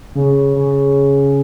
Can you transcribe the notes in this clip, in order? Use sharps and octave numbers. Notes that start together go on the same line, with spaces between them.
C#3
C#3